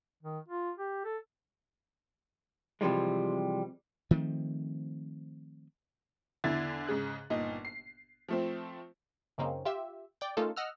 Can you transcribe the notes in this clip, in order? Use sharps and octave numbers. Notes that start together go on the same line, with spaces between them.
D#3
F4
G4
A4
C3 E3 F3 G3 G#3
D#3 F3 A3 C4
E2 D3 E4 G#6 A6
G#2 C#3 G#4 F#6
G1 A#2 D#4
C7
F3 A3 C4
F#2 C#3 A#3 C4 C#4 D#4
F4 G4 E5
D5 G5
A3 A#3 C#4 D#4 F4 A4
D#5 F#5 E6 F6